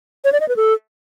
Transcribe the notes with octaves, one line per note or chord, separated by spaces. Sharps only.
C#5
D5
D#5
B4
A4